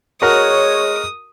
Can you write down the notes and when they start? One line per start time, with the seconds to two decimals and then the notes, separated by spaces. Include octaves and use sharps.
0.22 G#3 F#4 A#4 C#5 D#6